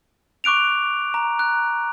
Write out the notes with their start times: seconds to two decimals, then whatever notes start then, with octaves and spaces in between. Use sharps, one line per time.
0.44 C#6 D6 F#6 D7 F7
1.14 A#5
1.39 F#6